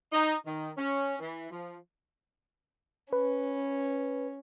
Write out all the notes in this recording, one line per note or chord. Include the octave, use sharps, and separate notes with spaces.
D#4
D#3
C#4
E3
F3
C#4 B4